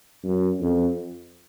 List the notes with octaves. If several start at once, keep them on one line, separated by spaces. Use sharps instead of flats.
F#2
F2